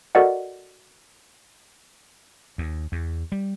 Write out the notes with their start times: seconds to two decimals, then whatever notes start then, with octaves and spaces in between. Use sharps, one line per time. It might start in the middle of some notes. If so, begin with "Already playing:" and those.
0.15 F#4 A4 A#4 D5 D#5 F#5
2.58 D#2
2.92 E2
3.32 G3